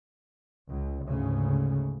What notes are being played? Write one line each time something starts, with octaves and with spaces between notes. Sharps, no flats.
C#2
D2 G#2 C#3